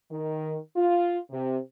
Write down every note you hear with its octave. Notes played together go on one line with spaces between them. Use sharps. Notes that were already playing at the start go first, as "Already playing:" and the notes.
D#3
F4
C3